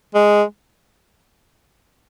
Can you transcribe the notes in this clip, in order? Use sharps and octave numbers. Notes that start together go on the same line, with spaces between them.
G#3